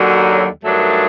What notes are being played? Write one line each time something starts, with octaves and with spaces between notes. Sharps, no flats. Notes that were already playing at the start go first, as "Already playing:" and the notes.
Already playing: D#2 D3 F#3
G2 D#3 F#3 A3 D4